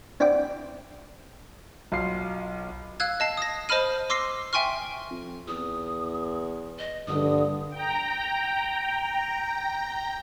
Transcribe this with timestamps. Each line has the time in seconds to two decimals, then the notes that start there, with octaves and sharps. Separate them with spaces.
0.20 C4 D4 E4 F#5 G5 D6
1.92 B1 F4 C7
3.00 F5 E6 F#6 G#6
3.20 D#5 A5 C7
3.37 D#6 A#6
3.69 C5 D#5 A5 B5 F6 D#7
4.10 C6 D6 E6 A#6 C7
4.53 E5 G5 G#5 C6 C#6 F6
5.10 F2
5.48 E2 D#6
6.79 D#5
7.08 A#1 G2 D3 D#6
7.70 G5 A#5